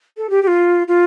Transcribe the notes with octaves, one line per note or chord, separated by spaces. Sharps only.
A4
G4
G4
F4
F4